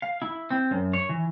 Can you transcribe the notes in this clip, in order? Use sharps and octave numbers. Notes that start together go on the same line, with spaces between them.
F5
E4
C4
F#2
C#5
E3